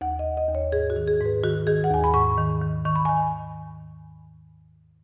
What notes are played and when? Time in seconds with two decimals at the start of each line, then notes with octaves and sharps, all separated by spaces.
0.01 D#2 F#5
0.19 D#5
0.25 D#2
0.37 D#5
0.49 D#2
0.55 C#5
0.72 G#2 G#4
0.90 F#4
0.96 D#3
1.08 G#4
1.20 G#2
1.26 B4
1.44 D#3 F#4
1.67 D#3 G#4
1.84 F#5
1.90 D#2 G#5
2.04 B5
2.14 G#2 C#6
2.38 D#3
2.61 D#3
2.85 D#3 C#6
2.96 B5
3.05 D#3 G#5